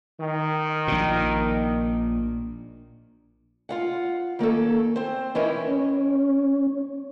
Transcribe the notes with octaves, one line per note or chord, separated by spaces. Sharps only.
D#3
A#1 A#2
F4 F5 F#5
D#3 A#3 C#4 A4
C4 C5
E3 C4 C#4 E4 A#4 D#5
C#4